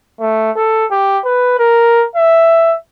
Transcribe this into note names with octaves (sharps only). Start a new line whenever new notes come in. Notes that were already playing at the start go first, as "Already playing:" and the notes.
A3
A4
G4
B4
A#4
E5